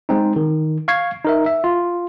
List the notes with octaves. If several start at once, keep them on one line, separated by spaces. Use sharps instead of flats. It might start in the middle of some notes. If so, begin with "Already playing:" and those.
G#3 C4 D#4
D#3
F5 C#6 G#6 C7
D#4 A#4 E5
E5
F4